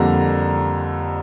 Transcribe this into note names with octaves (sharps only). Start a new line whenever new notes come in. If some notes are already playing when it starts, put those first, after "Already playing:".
Already playing: F2 D3 G3 A#3 A#5